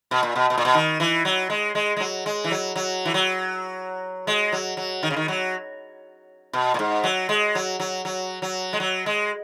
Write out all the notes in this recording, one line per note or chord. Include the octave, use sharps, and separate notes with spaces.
B2
A#2
B2
B2
A#2
B2
D#3
E3
F#3
G#3
G#3
G#3
F#3
G#3
E3
F#3
F#3
E3
F#3
G#3
F#3
F#3
D#3
C#3
D#3
F#3
B2
A#2
G#2
F#3
G#3
F#3
F#3
F#3
F#3
G#3
F#3
G#3